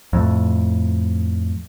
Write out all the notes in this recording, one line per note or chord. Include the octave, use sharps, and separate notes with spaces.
F2 A2